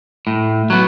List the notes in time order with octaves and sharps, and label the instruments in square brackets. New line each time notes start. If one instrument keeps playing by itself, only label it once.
[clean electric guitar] A2
F#3 B3